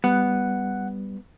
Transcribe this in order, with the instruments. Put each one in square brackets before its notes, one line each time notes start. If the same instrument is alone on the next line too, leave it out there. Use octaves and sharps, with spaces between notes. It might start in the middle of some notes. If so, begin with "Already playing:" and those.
[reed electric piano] G3 [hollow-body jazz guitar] B3 [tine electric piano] F#5